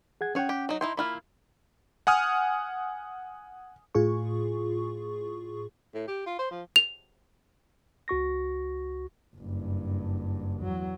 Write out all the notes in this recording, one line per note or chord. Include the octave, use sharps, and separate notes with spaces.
G#4 F#5 G#6
C#4 G#4 C#5 F#5 G5
G4
F#3 D#4
D#4 E4 G5 C6
A#3 E4 F4 B5 F6
F#5 G#5 D#6 F6
A2 F4 G#4 C#6
A2
G4
F4
C5
F3
F7
C#2 F#4 C#6 A#6
F#1 G2
E2 F#3